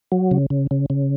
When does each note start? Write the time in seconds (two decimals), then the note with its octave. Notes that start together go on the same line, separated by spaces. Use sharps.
0.12 F#3
0.31 C#3
0.50 C#3
0.71 C#3
0.90 C#3